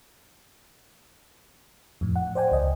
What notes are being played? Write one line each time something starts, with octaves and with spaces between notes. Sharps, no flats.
F2 A2
F#5
C5 D5 G5 G#5
C#2 D#5